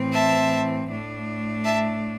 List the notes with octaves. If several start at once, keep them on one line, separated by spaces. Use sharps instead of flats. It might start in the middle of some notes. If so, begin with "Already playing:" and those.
Already playing: A2 E3 C4
E5 A5
A2 A3 D4
E5 A5